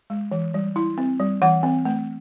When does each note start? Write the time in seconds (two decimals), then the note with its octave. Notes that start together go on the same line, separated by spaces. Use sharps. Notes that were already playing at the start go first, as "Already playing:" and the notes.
0.10 G#3
0.32 E3
0.54 G3
0.76 E4
0.98 C4
1.20 G3
1.42 E3 F#5
1.63 C4
1.85 A3